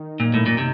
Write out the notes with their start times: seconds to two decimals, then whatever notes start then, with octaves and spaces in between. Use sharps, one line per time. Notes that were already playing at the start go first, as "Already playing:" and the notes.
Already playing: D#3 D#4
0.20 F#2 A#2
0.34 A2
0.46 A#2
0.58 C3